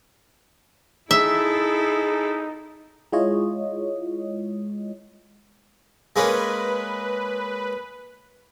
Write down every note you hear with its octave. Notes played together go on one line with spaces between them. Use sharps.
D#4 E4 G#4 A4 E5
G#3 E4 F4 C#5 D#5
G#3 A#3 C#4 B4